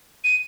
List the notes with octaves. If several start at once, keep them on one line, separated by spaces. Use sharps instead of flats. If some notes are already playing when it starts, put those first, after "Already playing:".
D#7